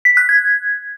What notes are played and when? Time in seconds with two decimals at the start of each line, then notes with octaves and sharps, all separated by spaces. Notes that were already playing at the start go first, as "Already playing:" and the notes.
0.05 B6
0.17 F#6
0.29 G#6